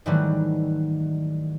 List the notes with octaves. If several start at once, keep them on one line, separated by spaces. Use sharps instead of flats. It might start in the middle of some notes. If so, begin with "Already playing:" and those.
G#2 D#3 E3 F#3 G3 A3